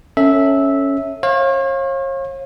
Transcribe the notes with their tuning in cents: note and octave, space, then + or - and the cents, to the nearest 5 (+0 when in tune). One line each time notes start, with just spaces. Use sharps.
C#4 +0 A4 +25 E5 -10
C#5 -40 F5 +5